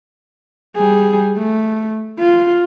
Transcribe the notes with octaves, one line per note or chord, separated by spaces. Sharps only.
G3 G#4
A3
F4